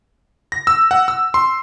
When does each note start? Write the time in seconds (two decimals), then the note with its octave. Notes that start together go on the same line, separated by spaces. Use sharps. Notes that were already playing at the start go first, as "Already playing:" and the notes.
0.52 A#6
0.67 E6
0.91 F#5
1.08 E6
1.34 C6